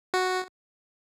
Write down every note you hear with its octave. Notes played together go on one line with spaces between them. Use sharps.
F#4